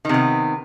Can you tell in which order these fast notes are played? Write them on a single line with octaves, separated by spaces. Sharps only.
D#3 C3 B3